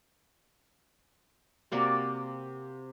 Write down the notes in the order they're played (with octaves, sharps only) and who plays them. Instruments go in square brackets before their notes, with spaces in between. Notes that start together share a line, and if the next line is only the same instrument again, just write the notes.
[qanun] C3 A#3 F#4 D5